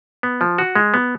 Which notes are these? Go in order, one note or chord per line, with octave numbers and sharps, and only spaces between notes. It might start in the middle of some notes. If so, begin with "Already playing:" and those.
B3
F3
F#4
G#3
B3